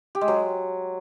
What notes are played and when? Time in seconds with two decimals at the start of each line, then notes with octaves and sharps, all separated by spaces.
0.15 G4
0.21 G#3
0.28 F#3